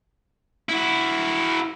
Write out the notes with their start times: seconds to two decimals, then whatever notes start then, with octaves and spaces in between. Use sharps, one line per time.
0.69 E4 F#4